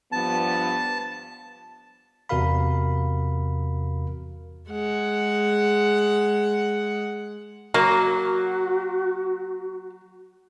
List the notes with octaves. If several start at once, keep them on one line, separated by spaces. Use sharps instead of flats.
G2 F3 B3 A5
E2 C3 F#4 A#4 F5 B5
G#3 F#5
F#3 A#3 F#4